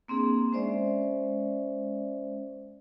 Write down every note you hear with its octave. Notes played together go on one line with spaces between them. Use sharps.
A#3 C4 D4 G#4
G#3 C#4 C5 D5 E5